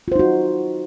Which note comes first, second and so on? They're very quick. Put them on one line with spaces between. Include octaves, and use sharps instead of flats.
F4 C5 D#4 F#4